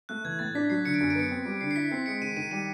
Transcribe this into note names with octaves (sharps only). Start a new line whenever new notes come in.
A3 F#6
E3 G#6
A2 A6
D4 B6
F#3 C7
D3 C#7
D7
F#2 C#7
D7
B3 C#7
C4
G3
D3 C7
C7
E4 B6
C4 C7
G#3 C#7
D#3 D#7
D#3 D#7
G3 D#7